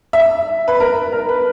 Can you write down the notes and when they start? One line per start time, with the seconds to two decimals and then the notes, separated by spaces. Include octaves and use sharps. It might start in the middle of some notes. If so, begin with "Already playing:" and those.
0.13 E5
0.68 B4
0.80 A#4
1.12 A#4
1.29 B4